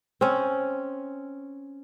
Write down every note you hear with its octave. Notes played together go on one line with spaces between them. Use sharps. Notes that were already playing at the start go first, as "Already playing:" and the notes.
C4 C#4